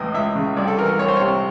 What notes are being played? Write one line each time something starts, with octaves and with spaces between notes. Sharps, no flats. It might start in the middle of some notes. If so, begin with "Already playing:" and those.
Already playing: C#2 A2 E3 D#5
C#2 E5
C#3
C2 D5
A4
E3 A#4
A#4
C2 C#5
C5
C3 C#5